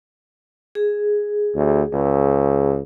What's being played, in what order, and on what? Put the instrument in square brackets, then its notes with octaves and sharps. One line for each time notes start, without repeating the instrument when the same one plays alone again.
[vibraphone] G#4
[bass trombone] D2
C#2